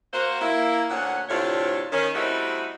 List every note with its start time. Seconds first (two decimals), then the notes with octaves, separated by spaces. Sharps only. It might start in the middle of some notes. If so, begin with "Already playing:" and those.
0.13 A#3 F#4 C5
0.41 A#3 E4
0.90 D2 A#2 C#4 F#5
1.29 D2 A2 C3 D4 F4 C#5
1.92 D#3 C#4
2.15 G3 A3 C4 D#4 E4 F#4